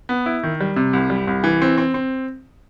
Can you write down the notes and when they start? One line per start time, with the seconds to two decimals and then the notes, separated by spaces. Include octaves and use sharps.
0.09 B3
0.26 E4
0.43 D#3
0.61 G3
0.76 C3
0.93 C2
1.10 G3
1.27 C2
1.44 E3
1.62 C4
1.78 C4
1.94 C4